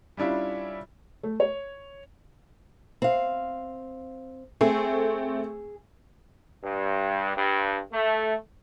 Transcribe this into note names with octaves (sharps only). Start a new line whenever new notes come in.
G3 C#4 D4 E4 F4
A3
C#5
C4 F5
A3 C4 G#4
G2
G2
A3